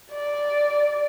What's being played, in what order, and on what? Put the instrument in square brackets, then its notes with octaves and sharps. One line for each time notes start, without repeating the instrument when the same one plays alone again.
[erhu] D5